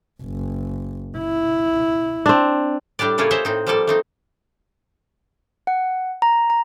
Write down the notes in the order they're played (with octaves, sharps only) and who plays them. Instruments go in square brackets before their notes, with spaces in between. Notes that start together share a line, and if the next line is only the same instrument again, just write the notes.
[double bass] F#1
E4
[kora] C4 D4
[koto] A2 G3 D4 G4 D5
C#3 A3 A#3 E4 F4 C#5
C5 C#5 D#5 E5 G#5
A2 C4 D#4
F3 G3 A#3 A4 D5
A3 C4 D#4
[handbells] F#5
A#5
A#5